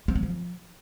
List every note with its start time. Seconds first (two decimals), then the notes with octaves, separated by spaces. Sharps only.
0.08 C4
0.16 F#3
0.23 F3